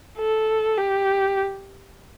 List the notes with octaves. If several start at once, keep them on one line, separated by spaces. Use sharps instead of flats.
A4
G4